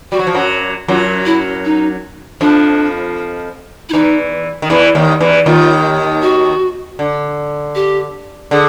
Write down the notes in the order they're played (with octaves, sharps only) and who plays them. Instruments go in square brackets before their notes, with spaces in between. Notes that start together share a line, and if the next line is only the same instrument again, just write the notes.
[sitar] G3 [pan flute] F#4
[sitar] F#3
F3
F#2 F#3
[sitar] F#2 F#3 [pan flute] F4
[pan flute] E4
D#4
[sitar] F2 F3 [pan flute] D4
[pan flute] E4
[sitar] E2 E3 [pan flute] D#4
[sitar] D#3
[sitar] E2 E3 [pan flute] E4
[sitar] D#2 D#3
E2 E3
[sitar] D#2 D#3 [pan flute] F4
[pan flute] F#4
[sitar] D3
[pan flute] G4
[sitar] D3 [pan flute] G#4